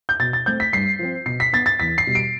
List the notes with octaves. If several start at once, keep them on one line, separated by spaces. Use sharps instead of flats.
G6
B2 A6
A6
A3 C4 G6
B6
G2 C7
F3 C4
B2 C7
B6
B3 A6
A6
E2 B6
C7
B2 G3
D7